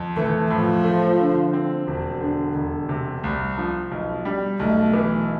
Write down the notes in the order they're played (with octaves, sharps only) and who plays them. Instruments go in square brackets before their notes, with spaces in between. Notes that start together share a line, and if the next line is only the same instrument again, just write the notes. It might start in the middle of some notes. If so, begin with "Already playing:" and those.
Already playing: [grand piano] F2
[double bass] E3 [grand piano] A3
[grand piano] A2 [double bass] F3
[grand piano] A3
D3
C4
E1
D3
E1
C3
C2
F3
B1
G3
[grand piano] B1 [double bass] A3
[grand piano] E3